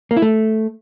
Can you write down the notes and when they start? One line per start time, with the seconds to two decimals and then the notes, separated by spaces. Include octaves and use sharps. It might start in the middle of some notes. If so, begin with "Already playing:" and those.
0.11 A#3
0.17 E4
0.22 A3